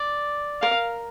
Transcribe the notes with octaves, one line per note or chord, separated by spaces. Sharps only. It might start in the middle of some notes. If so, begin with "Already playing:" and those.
Already playing: D5
A#4 F5